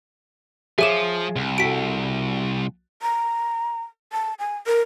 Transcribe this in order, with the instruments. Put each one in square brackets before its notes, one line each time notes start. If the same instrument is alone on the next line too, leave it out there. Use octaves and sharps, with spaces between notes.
[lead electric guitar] F3 [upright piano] G#4 C#5 D6 [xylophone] E5 D#7 E7
[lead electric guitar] C2
[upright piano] F#4 A4 [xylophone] B6 D7
[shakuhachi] A#5
A5
G#5
A#4